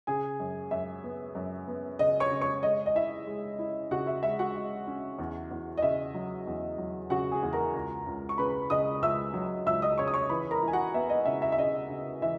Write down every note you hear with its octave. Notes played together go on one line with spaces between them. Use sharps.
C#3 G#4 G#5
F#2
F#2 E5
B3
F#2
B3
C#3 D#5
C#5 C#6
C#3
C#5 C#6
G#3 D#5
D#5
E4 E5
G#3
E4
C#3 F#4 F#5
E5
G#3 E5
F#4 F#5
G#3
C#4
E2
E2
D#5
C#3 E5
F#3
E2
F#3
C#3 F#4 F#5
G#4 G#5
E2
A#4 A#5
C#2
C#2
C#6
C#3 B4 B5
C#3 D#5 D#6
C#2 E5 E6
F#3
C#2 E5 E6
D#5 D#6
C#3 C#5 C#6
D#6
C#5 C#6
E3 B4 B5
A#4 A#5
E3 G#5
F#4 F#5
B3 E5
D#5
C#3 E5
E5
E5
C#3 D#5
C#3
E3 E5